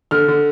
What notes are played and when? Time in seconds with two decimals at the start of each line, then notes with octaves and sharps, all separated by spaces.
0.11 D3 F6
0.28 D3